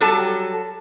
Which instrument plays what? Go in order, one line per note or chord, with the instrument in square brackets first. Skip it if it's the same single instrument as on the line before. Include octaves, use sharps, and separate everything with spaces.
[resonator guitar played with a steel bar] F#3 G3 A4 A5